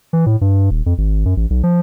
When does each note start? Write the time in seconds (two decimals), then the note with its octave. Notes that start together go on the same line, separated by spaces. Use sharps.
0.13 E3
0.26 A2
0.41 G2
0.71 D#1
0.86 F2
0.98 G#1
1.25 F#2
1.37 A1
1.50 B1
1.63 F3